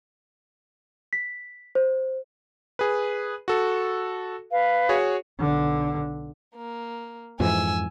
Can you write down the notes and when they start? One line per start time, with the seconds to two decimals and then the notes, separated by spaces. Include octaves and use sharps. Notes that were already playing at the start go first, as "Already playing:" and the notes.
1.13 B6
1.75 C5
2.79 G#4 B4
3.48 F#4 A4
4.50 B4 F5
4.89 F#4 G#4 C#5
5.39 B1 D3
6.56 A#3
7.40 F2 G#2 E3 G#5 E6